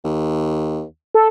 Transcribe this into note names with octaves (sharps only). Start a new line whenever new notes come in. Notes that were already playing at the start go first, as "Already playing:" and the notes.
D#2
A4